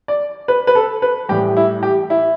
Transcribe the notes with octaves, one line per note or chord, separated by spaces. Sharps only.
D5
B4
B4
A4
B4
A2 E3 G3 G4
E4
G4
E4